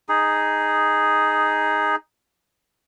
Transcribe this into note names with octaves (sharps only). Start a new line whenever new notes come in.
D#4 G#4